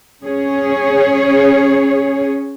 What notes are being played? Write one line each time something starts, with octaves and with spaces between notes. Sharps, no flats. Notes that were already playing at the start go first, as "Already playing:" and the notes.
C#4 G#4 C#5